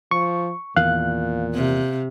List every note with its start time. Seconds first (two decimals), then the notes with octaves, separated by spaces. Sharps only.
0.11 F3 C#6
0.76 E2 A#2 D#3 F5 F#6
1.54 C3